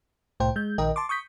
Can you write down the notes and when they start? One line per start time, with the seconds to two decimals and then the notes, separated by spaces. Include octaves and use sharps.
0.40 C2 A2 C5 G5
0.56 G#3 G6
0.78 A#1 D#3 A#4 D#5 G5
0.96 A5 C6 D6
1.09 C#6 D#6 G6 B6